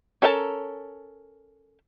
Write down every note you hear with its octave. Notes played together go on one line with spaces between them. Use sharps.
C#4 A4 A#4 D#5 A5